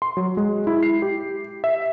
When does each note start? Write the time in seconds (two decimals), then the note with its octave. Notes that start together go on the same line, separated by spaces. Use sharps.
0.02 C6
0.17 F#3
0.37 G#3
0.67 E4
0.83 C7
1.02 G4
1.64 E5